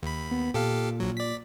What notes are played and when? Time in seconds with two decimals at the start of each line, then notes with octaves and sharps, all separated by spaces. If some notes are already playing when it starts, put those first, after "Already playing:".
0.03 D#2 B5
0.31 B3
0.54 A#2 G4 A4 F5
1.00 A#1 F#3
1.17 D5 B6